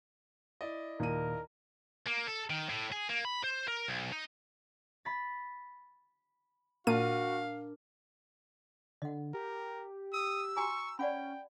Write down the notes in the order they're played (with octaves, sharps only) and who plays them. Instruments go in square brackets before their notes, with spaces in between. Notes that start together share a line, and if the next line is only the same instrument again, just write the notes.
[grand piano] E4 D5 D#5
[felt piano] D#2 D#7 [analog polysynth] A#2 [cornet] A#4
[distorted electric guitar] A#3
A4
D#3
A2
G#4
A#3
B5
C5
A#4
B1
D#4
[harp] B5 A6
[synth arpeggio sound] A#2 D#7 [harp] D4 A#4 [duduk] F#4 [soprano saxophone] F5
[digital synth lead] D3 [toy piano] D#5 F#5
[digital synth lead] G4 [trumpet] A#4
[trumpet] D#6 [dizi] E6
[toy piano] F#4 G#5 A#5 [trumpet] C#6
[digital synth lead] C#4 [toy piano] D5 F#5 B5 [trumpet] G5